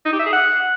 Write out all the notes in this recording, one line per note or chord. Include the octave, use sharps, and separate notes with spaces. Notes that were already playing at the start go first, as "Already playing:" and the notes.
D#4
G4
E5
G#4
F#5